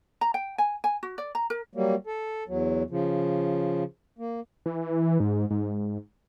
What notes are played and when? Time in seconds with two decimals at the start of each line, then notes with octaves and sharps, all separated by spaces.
0.21 A#5
0.34 G5
0.58 G#5
0.84 G#5
1.03 F#4
1.18 D5
1.35 A#5
1.50 A#4
1.75 F#3 G3 A#3
2.07 A4
2.48 E2 F#3
2.90 C#3 F3
4.19 A#3
4.66 E3
5.20 G#2
5.51 G#2